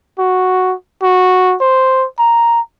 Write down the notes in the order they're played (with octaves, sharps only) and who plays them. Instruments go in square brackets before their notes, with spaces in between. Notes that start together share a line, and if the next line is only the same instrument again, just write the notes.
[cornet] F#4
F#4
C5
A#5